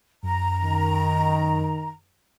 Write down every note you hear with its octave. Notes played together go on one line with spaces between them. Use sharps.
F#2 A#5
D#3